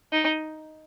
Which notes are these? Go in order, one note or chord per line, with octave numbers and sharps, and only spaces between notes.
D#4